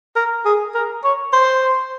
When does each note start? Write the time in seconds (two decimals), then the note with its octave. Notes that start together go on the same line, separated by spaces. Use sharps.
0.16 A#4
0.45 G#4
0.75 A#4
1.04 C#5
1.33 C5